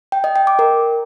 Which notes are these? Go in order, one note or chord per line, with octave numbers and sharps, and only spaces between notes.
G5
D#5
G5
D6
A#4